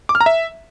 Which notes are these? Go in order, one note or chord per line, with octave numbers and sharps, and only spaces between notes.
D6
F6
A#5
E5